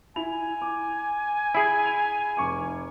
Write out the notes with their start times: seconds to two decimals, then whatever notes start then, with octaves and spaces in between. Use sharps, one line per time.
0.16 E4 G#5 F7
0.62 D6
1.55 E4 G#4
1.86 B5 F7
2.37 F1 C#6 D6